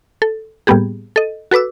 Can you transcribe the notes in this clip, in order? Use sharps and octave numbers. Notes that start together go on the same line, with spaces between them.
A4
A2 G3 A#3 B3 G4 G#4
A4 D#5
F#4 A4 B4 D6 E6